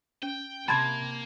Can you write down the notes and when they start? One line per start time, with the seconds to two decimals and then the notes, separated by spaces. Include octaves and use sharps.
0.23 C#4 G5
0.68 C3 A#3 A5 B5 C6 G#6